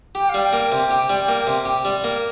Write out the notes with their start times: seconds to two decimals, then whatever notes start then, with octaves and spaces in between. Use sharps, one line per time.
0.15 G4 G5
0.29 F5
0.34 G3
0.42 G5
0.53 A#3
0.72 C3
0.91 G4
1.10 G3
1.28 A#3
1.47 C3
1.66 G4
1.85 G3
2.04 A#3